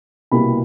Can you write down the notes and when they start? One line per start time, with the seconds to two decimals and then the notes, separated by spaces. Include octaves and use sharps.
0.31 C2 B2 G3 A#3 B5